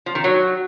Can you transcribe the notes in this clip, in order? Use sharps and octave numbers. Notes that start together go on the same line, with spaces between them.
F3
D#3
F#3